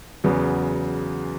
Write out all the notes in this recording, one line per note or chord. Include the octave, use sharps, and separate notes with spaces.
E2 C#3 F#3 B3